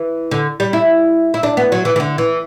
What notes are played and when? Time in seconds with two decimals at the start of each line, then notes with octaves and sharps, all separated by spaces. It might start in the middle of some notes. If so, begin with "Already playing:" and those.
Already playing: E3
0.31 D3
0.60 G3
0.73 E4
1.34 E4
1.43 D4
1.57 B3
1.72 F#3
1.85 E3
1.96 E3
2.00 D3
2.18 E3